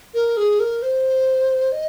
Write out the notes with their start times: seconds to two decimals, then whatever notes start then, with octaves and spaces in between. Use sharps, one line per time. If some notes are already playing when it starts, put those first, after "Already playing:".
0.14 A#4
0.37 G#4
0.60 A#4
0.82 C5
1.72 D#5